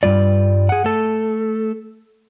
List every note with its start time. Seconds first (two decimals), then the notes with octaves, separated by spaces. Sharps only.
0.03 G2 G3 F4 D5
0.69 G#4 F#5
0.84 A3 A4